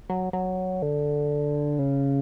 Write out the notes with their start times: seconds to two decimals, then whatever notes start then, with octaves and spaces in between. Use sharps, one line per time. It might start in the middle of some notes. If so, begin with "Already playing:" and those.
0.10 F#3
0.33 F#3
0.82 D3
1.79 C#3